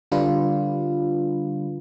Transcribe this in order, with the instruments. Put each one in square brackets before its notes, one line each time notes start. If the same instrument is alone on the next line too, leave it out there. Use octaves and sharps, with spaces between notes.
[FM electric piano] D3 G3 D4 F4 B4